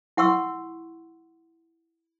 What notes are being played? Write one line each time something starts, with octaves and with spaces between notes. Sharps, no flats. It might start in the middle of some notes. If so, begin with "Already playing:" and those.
E4 F#5 C6 C#6 E6